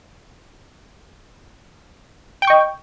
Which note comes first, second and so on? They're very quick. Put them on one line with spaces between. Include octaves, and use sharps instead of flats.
G5 G6 C#6 D#5